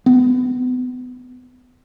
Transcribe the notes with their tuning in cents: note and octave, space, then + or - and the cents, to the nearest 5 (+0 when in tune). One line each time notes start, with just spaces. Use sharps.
B3 +25